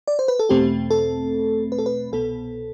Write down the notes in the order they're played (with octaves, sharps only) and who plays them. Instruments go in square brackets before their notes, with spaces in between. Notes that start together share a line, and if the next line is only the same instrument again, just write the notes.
[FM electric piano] D5
C5
B4
A4
E2 B2 A3 C4 G4
A4
B4
A4
B4
C2 B2 B3 A4